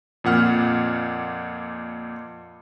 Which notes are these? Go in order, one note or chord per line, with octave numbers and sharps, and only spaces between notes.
F2 A#2 F#5 F6